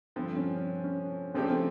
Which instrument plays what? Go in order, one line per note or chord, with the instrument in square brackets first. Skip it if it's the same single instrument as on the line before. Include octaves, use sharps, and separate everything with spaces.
[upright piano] G2 D3 F3 [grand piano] C4
[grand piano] C#4
C#4
C#4
[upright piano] C#3 F3 A3 D4 G4 [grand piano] C4
[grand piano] C4